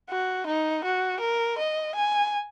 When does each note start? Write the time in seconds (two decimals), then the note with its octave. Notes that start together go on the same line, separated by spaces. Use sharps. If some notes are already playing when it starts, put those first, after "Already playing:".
0.10 F#4
0.47 D#4
0.84 F#4
1.20 A#4
1.58 D#5
1.95 G#5